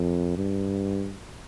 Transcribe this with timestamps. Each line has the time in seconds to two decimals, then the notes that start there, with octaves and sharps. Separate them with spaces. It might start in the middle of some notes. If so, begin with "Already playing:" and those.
Already playing: F2
0.37 G2